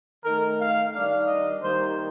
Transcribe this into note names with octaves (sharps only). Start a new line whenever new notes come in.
D#3 A3 D#4 A#4
F5
D#3 G3 D4 F5
D#5
D#3 G3 A#3 C5